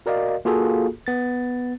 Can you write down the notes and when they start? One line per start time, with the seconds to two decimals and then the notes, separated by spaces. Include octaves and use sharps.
0.06 F#4 A#4 D5 D#5 F5
0.45 A#3 F4 F#4 G#4 A4
1.07 B3 A6